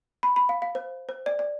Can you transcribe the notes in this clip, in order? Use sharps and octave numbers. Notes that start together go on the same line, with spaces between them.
B5
B5
F5
F5
C5
C5
D5
D5